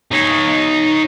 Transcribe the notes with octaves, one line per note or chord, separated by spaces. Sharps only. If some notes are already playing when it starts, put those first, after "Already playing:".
D#4 C#5